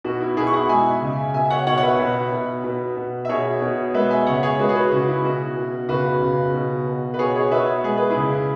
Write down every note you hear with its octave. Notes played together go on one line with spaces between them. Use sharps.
B2 F#4
E4
B2 E4 G#4
C#6
F#5 B5
G#3 E5 G#5
C#3
B2 E5 G#5
E5
C#5 F#5
B2 C#5 F#5
F#5
B4 E5
B2
B2
B2
B2
E5
B2 G#4 C#5
B2
G#3 B4 E5
E5 G#5
C#3 C#5 F#5
G#4 C#5
G#3 F#4 B4
G#4
F#4 B4
C#3 F#4
E4
B2 F#4
B2
C#3 F#4 B4
C#3
B2
B2
B4
B2 G#4 C#5
G#4 C#5
B2 B4 E5
G#3 G#4
B4
E4 G#4
C#3